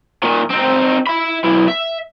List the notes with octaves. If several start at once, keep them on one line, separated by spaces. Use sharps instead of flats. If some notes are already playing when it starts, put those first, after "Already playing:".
A#2 D#3
C4 D#4
E5 B5
B1 E4
E5